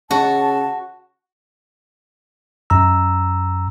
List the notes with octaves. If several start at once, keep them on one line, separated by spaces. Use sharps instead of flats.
C#3 F#4 A5
F#2 A#5 E6